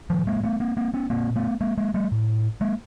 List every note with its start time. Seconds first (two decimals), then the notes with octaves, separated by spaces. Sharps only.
0.10 A2 D#3 F3
0.27 G#3 A#3
0.43 A3 B3
0.60 A#3 C4
0.77 A#3 C4
0.94 B3 C#4
1.10 A#2 A#3 C4
1.36 A3 B3
1.61 G#3 A#3
1.78 G#3 A#3
1.94 G3 A3
2.12 A2
2.61 G#3 A#3